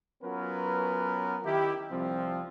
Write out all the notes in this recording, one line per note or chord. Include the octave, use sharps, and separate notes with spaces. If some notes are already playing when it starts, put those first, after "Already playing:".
F#3 B3 C#4 F4 A#4 B4
D#3 E4 G4
C2 F3 C4